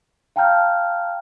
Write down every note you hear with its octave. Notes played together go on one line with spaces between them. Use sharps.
F5 G5 A5 A#5 F6 G6